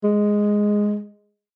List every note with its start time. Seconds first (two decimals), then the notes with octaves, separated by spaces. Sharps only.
0.04 G#3